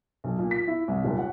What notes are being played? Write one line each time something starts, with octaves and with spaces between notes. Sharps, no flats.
B1
A#2
B6
E4
C2
D#1
F#5